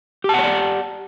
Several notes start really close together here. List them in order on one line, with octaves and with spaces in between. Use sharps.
G4 A5 F#5 C#5 D5